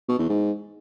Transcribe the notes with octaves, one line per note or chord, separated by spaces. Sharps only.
B2
E2
G#2